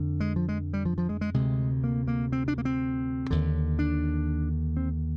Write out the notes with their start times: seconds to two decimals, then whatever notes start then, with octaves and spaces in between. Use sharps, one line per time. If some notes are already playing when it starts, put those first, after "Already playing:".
Already playing: F2 D3
0.20 G#3
0.36 F3
0.49 G#3
0.73 G3
0.85 F3
0.98 F3
1.09 G#3
1.21 G#3
1.34 D2 C3 G#3
1.84 A#3
2.08 A#3
2.32 C4
2.48 D4
2.58 A#3
2.65 C4
3.30 D#2 D3
3.79 D4
4.77 C4